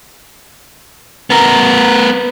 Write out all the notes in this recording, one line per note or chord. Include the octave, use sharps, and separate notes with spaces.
B3 A#4